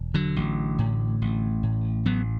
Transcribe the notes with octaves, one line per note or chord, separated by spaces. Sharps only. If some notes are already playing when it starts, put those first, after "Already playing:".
Already playing: E1
D3 F#3
A1
A2
A1
A2
A1 F#3 B3